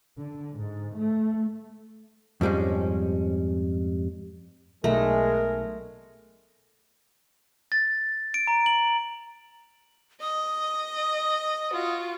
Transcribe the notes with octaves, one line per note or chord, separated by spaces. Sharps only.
D3
G#2
A3
F2 G#2 G3 G#3 C#4
B1 G#3 A3 A#4
A6
D7
A#5
F#7
D#5 D#6
F4 F#4